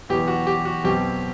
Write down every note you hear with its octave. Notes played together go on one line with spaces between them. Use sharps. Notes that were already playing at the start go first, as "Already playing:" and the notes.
E2 B2 F#3 G4
F#4
G4
F#4
B1 B2 F#3 C4 G4